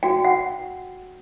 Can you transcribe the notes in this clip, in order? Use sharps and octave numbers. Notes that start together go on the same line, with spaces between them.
F#4 G5
F#5